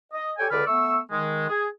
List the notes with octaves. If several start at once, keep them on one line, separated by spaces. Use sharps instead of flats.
D#5
G4 A4 C#5 G5 G#5
C#2 D3 A4 B4 D5 F6
A3 B3 C#6 E6
D#3 G#3
G#4